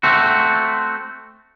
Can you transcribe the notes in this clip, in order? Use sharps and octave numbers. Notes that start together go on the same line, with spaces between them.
A3 C4 F#4